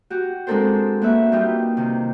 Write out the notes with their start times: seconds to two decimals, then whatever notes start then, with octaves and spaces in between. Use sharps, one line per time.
0.10 F#4 G4
0.47 G#3 C4 D4 A4 A#4 C5
1.02 A#3 F#4 B4 E5
1.32 G3 D#4 F4 G4
1.77 C3 D#3